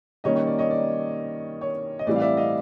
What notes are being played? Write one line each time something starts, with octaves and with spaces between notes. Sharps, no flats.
D#3 G3 A#3 C#4 C#5 D#5
C#5
D5
C#5 D#5
D5
C#5
D#5
A2 E3 G3 C4 D5
F5
D5 E5
D#5 F5